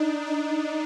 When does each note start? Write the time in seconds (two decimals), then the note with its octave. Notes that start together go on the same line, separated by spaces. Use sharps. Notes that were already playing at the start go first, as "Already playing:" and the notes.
Already playing: D4 D#4
0.27 D4